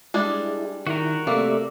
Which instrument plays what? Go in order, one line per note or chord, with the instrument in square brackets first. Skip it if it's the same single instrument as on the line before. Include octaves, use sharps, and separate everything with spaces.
[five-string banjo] G3 G#3 D4 [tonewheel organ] E4 G#4
[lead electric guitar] D#3 [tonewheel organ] E4 [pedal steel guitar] F#4 A#4
[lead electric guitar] C3 A3 [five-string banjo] A#3 [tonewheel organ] G4 D5 E5